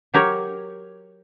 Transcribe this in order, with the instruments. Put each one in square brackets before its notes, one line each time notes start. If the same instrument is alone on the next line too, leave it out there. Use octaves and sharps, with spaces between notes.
[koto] F#3 G4 A#4 C#5